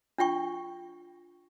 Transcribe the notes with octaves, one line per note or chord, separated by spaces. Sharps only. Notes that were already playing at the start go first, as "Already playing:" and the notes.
D4 F4 G5 C#6